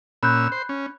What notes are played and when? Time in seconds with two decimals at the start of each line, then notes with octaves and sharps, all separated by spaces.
0.23 A#2 C#4 B5 E6 F#6 G6
0.52 C5
0.69 C#4